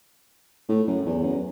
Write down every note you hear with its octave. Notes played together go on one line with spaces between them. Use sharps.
A2
F#2
E2
F#2